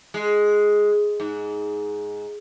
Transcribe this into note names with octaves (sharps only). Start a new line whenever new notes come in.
G#3
G#2